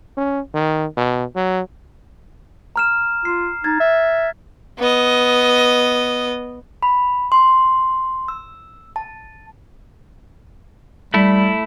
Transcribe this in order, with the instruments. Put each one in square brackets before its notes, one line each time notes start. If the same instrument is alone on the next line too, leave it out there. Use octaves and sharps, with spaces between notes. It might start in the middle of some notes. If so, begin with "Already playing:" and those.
[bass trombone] C#4
D#3
B2
F#3
[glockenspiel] A#5 F6 E7
[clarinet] F4 [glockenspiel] C7
[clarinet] D#4 [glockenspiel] G#6 A6
[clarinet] E5
[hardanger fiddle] B3 D#5
[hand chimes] B5
C6
E6
A5
[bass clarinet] G3 [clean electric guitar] A3 E4